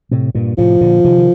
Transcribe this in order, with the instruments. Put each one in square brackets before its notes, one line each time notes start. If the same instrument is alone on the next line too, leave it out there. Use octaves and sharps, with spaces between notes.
[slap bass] A2 C3
G2 A#2
[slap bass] A2 C3 [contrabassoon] F3
[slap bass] A#2 D3
C3 D#3
D#3